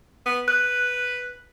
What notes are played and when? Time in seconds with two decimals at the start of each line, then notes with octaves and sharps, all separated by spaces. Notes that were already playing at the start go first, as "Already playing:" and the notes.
0.26 B3
0.48 B4 F#6